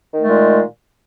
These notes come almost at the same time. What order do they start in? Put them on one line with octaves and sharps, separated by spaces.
D#3 A3 G#3 A#2